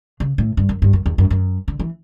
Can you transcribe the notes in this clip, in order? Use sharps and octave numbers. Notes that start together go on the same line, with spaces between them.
C#3
A2
G2
F#2
G2
F#2
E2
F#2
F#2
D3
E3